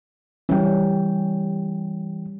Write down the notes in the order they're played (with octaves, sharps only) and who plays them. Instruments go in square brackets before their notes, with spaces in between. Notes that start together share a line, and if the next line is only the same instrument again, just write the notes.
[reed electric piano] E3 G5 [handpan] G3 C#4